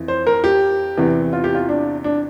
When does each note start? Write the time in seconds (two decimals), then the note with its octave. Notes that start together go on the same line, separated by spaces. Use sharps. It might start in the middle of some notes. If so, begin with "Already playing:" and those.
Already playing: F2 E3
0.08 C5
0.27 A#4
0.44 G4
0.97 E2 C3 E3
1.33 F4
1.44 G4
1.55 F4
1.69 D4
2.04 D4